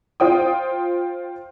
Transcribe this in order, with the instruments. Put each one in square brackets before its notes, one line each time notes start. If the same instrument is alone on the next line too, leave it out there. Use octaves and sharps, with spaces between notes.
[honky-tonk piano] F4 C5 G5 D#6